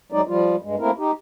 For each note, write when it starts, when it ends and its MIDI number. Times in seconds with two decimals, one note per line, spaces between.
0.12 0.21 39
0.12 0.21 54
0.12 0.21 56
0.12 0.21 63
0.12 0.21 74
0.27 0.56 53
0.27 0.56 55
0.27 0.56 65
0.62 0.76 43
0.62 0.76 56
0.79 0.91 57
0.79 0.91 58
0.79 0.91 60
0.79 0.91 64
0.79 0.91 70
0.98 1.11 63
0.98 1.11 67